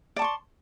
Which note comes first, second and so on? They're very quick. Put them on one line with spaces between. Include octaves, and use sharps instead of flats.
D5 A5 C#6 C6